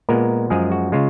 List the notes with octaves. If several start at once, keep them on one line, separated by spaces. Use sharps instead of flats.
A#2 G#3 B3 A#4
F#2 F3 G#3 G#4
F#4
C#3 G#3 F4